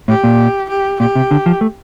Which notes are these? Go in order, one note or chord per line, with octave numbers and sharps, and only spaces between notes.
A2 G4
A#2
G4
A#2 G4
C3
D3
F3
A3